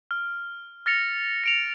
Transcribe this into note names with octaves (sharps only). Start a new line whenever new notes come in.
F6
F6 A6 A#6 C#7 F7
C#7 D7 F7